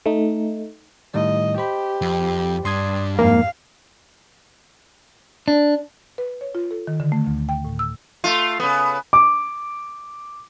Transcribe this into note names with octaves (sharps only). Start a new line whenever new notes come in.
A3 D#4
A2 D#3 G3 D#5
G4 C5 B5
F2
G2 D4 C6 D#6 G#6
F2 G#2 A#3 F5
D4
B4
C#5
F4
A4
D#3
D3
A3
D2
G5
A2
E6
A3 F4
C#3 B3
D6